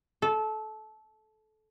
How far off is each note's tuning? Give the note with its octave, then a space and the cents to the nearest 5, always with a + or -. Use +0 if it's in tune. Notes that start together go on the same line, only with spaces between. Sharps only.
A4 -20